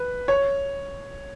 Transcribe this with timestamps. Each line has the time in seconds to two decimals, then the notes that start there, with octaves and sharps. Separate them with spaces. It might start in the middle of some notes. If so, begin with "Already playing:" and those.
Already playing: B4
0.28 C#5